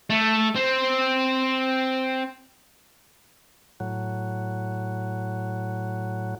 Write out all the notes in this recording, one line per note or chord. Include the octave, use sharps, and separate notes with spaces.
A3
C4
A2 F#3